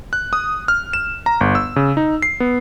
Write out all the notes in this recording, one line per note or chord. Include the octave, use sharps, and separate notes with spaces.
F#6
D#6
F6
E7
A#5
G1
E6
C#3
D#4
C7
B3